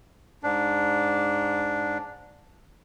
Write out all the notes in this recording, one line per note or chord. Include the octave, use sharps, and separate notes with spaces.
G#2 D4